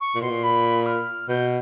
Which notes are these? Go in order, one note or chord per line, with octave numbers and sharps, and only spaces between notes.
C#6
A#2
B2 C6
A#2
B5
F6
B2 G6